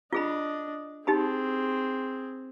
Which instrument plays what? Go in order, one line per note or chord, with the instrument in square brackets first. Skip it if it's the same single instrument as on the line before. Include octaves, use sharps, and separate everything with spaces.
[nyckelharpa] D4 D#5 [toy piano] F4 G#4 B5
[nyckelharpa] C4 G#4 [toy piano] D#4 G4 B5